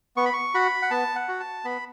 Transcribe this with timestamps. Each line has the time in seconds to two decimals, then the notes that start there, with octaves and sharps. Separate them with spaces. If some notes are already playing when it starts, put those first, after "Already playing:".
0.17 B3 C#6
0.25 B5
0.33 C#6
0.54 F#4 B5
0.82 F#5
0.91 B3 A5
1.16 F#5
1.28 F#4
1.40 A5
1.65 B3 B5